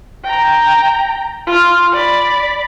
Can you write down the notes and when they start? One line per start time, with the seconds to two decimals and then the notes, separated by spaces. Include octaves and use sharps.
0.24 G5 A#5
1.47 F4 F6
1.93 D5 B5